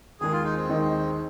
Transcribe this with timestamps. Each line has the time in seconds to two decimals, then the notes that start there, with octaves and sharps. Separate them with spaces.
0.21 D#2 D#3 G#3 G#4
0.32 F4
0.44 D#4
0.56 C4
0.69 D#2 D#3 G#3 D#4